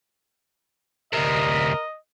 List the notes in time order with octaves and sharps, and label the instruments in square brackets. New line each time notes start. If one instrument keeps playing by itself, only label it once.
[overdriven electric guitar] D2 C3 [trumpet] A#4 [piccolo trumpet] D#5